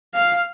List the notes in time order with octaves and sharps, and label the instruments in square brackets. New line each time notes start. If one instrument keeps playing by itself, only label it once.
[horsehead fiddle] F5